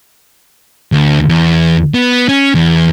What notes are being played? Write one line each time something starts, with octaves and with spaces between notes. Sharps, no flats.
D2
E2
B3
C#4
E2